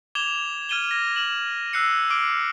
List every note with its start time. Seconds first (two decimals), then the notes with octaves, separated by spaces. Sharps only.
0.15 D6 G#6 E7 F7 G7
0.69 F6 G#6 D#7 E7 G7
0.91 A#6
1.16 F6 E7 F#7
1.73 E6 F#6 C7 C#7
2.10 D6 F6 D7